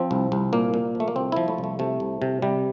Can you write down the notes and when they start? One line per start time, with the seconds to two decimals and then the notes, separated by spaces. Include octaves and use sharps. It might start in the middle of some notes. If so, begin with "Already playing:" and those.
Already playing: F3 C4
0.11 C2
0.32 C2
0.53 A#2 A#3
0.74 A#2
0.95 F3
1.00 A3
1.08 A#3
1.16 C2 C4
1.32 F3 E4
1.48 A3
1.58 C2
1.64 A3
1.79 C3 A3
2.00 C2
2.22 C3
2.42 C3 G3